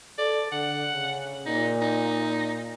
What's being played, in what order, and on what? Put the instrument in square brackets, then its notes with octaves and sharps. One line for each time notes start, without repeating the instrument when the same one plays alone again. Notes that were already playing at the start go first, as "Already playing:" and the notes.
[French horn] A4 [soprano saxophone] D5
[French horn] D3 [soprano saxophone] F#5
[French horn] C#3
[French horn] A#2 [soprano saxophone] D#4
[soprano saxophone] D#4